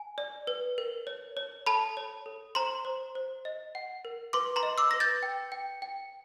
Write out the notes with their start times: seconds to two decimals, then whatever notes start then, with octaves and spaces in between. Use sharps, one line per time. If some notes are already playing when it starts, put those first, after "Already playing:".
Already playing: G#5
0.18 D5
0.47 B4
0.78 A#4
1.07 C#5
1.37 C#5
1.66 A4 A5 B5
1.97 C#5
2.26 A4
2.55 C5 A#5 C6
2.85 C5
3.15 C5
3.45 D#5
3.75 F#5
4.05 A#4
4.33 B4 C6 D6
4.56 A#5 C6
4.63 D#5
4.78 D6 E6
4.91 B4 A#6
5.00 G6 A6
5.23 G5
5.52 G5
5.82 G5